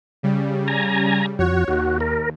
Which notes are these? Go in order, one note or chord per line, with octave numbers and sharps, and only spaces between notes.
C#3 G3
G#5 A#5
F2 F#4 C#5
D#2 F#4
A#4